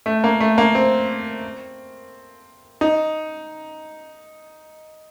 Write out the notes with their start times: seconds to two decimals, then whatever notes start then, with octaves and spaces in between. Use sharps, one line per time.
0.06 A3
0.24 A#3
0.41 A3
0.58 A#3
0.75 C4
2.81 D#4